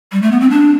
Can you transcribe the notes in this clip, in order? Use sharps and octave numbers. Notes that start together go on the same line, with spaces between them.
G3
A3
B3
C4
D4